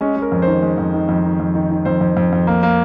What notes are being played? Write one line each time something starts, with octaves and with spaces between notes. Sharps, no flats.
G#3 C#4
G#3
A#4
F2
D#3 C5
G#3
F2
D#3
F2
D#3
F2
D#3
D#3
F2 C5
F2
F2
F2
A#3
A#3